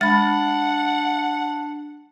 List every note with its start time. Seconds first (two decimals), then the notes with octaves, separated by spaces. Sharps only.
0.01 G#3 D4 F#5 B5 A6